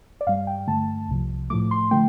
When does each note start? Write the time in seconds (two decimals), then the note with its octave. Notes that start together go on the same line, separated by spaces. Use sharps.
0.21 D5
0.27 G2 G3 F5
0.47 G5
0.67 G2 D3 A3 A5
1.09 C2 C3 F3
1.50 A2 F3 A3 D6
1.71 C6
1.91 D3 F3 A3 G5